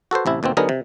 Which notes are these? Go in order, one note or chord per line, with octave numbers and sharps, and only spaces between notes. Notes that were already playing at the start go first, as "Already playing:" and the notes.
F#4 A4 B4 C5
A1 C3 E4
D#2 B2 A#3 C4
D3 F#3 B3 D#4 G#4 A#4
C3